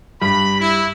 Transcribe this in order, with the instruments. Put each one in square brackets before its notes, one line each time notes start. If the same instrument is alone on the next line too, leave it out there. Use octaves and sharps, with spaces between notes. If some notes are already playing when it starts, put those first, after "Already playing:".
[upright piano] G2 [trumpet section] B5
[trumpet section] E4